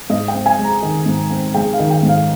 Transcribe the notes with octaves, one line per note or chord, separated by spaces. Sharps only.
G#2 D#5
G5
C4
G#5
G#3
A#5
D#3
G#2
C4
G#3 G5
F5
D#3
G5
G#2
F5